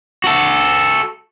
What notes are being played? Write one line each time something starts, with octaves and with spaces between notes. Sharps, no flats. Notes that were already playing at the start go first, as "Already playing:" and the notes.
F#4 A4